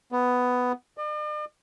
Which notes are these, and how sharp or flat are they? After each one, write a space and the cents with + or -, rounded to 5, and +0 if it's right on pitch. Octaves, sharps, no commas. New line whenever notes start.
B3 +10
D5 +45